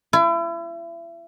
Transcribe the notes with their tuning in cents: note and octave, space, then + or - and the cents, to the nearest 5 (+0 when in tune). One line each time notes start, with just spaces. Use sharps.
E4 +35